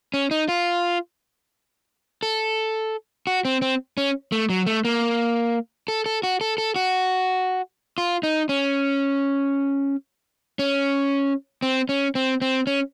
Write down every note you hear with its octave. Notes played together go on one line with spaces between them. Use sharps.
C#4
D#4
F4
A4
F#4
C4
C4
C#4
A3
F#3
A3
A#3
A4
A4
F#4
A4
A4
F#4
F4
D#4
C#4
C#4
C4
C#4
C4
C4
C#4